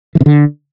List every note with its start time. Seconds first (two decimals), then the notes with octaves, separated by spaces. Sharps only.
0.15 E3
0.20 C3
0.26 D3